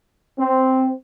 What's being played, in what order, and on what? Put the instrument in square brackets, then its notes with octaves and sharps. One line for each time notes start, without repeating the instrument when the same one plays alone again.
[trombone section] C4